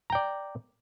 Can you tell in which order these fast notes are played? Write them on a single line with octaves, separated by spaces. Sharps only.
A#5 G5 D5